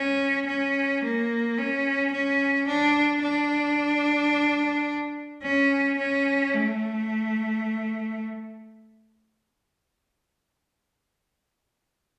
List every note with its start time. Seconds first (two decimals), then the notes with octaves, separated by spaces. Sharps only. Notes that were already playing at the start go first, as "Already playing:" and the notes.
Already playing: C#4
0.47 C#4
1.03 A#3
1.58 C#4
2.12 C#4
2.67 D4
3.23 D4
5.43 C#4
5.98 C#4
6.54 A3